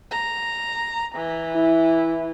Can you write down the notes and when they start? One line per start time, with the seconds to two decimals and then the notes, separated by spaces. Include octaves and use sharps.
0.11 A#5
1.15 E3
1.55 E4